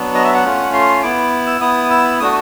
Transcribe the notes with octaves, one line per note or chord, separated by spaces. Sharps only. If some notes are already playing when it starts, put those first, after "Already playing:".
Already playing: F#3 B3 D4
D#5
E5
F#5
A3 C#4 F4
C6
B3 E4 D6
E6
B3 E4 D#6
E6
A3 D4 F#4 D#6